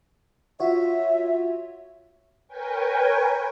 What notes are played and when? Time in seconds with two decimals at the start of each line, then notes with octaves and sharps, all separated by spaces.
0.60 F4 F#4 C#5 E5
2.48 A#4 B4 C#5 G5 G#5